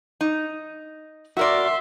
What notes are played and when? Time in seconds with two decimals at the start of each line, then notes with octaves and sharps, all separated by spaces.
0.21 D#4
1.37 F#4 A#4 D5 E5 C6